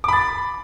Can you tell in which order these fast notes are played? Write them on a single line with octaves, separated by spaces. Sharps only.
D6 B5 A6